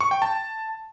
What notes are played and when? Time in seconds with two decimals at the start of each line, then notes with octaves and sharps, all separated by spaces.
0.01 C#6
0.11 G5
0.22 A5